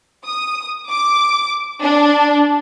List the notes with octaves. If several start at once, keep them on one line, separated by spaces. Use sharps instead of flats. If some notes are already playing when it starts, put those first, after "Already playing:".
D#6
D6
D4